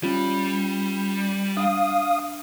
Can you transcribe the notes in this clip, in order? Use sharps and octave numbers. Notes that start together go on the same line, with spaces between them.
G3 C#4 F4
D4 F5 D#6 F6